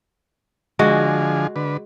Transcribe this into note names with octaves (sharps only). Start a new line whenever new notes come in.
D3 F3 G#3 F#4 G#4
D3 B4